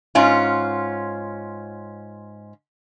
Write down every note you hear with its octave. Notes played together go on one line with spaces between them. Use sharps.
G#2 C#4 F4